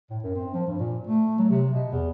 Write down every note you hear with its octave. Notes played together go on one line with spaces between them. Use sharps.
A2
F#2
C4
F3
G2
A#2
A3
F#3
C3
B2
E2